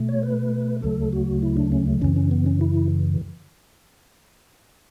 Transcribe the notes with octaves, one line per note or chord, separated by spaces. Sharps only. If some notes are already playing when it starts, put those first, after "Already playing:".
Already playing: B2 A3
C#5
B4
D2 C#3 F#3 A3 A4
F#4
E4
D4
C#4
F#2 C#3 E3 C#4
C#4
B3
C#4
E4